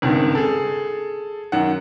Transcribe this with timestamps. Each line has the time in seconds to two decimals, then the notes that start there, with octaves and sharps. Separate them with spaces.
0.02 G#1 C#2 G2 D#3
0.35 G#4 A4
1.52 F#2 D#3 F#5